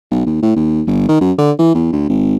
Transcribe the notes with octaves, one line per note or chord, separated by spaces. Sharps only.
B1
D#2
A2
D#2
G1
D#3
F#2
D3
E3
E2
D2
G#1